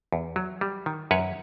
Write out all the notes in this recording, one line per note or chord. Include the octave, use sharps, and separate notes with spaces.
E2
F#3
G3
D#3
F#2 B4 C#5